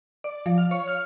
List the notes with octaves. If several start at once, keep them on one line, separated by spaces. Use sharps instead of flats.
D5
F3
F5
C#5
F6